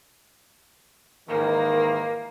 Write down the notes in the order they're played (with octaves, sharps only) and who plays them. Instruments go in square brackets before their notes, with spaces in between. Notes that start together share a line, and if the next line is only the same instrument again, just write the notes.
[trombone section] G#2 D#3 E3 [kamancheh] A#3